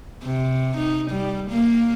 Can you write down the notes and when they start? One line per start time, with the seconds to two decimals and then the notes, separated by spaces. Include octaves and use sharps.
0.23 C3
0.77 D#4
1.10 G3
1.50 A#3